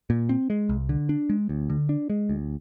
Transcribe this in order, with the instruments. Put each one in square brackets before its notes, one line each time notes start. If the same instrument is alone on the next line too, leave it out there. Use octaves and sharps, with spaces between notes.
[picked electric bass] A#2
C4
G#3
C2
D3
D4
G#3
D2
D3
D4
G#3
D2